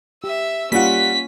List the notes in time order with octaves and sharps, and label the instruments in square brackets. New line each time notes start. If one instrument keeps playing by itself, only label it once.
[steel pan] G4 [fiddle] E5 E6
[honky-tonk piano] G3 F#5 [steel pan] A#3 F4 [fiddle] C#4 [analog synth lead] B6